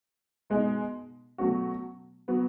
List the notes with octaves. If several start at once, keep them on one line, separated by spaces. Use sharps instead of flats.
B2 G#3 D#4
B2 F#3 A3 C#4 F#4
F#3 B3